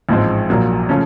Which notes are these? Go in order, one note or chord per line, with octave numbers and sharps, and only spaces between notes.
A1 G#2 F3 G#3 C4
A#1 A#2 F#3 A#3
C#3 F3 A3 C#4